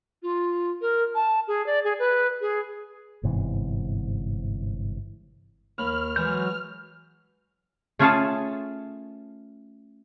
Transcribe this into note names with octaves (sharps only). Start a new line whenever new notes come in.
F4
A#4
A5
G#4
D5
G#4
B4
G#4
G1 G#2 C3 E3
D#2 B5 F6
E3 F#3 G#3 G6
A3 C#4 F4 G#4 C#5 A5